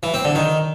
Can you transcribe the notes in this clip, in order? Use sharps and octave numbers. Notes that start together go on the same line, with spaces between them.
E3
C4
D3
D#3